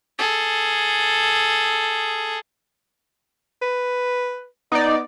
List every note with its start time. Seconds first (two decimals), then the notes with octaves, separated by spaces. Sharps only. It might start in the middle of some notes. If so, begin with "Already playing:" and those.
0.19 G#4 A4
3.62 B4
4.72 B3 D#4 D5